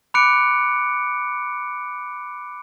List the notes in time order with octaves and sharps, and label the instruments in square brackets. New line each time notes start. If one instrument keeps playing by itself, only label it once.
[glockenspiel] B5 D6 F#6 C#7 D7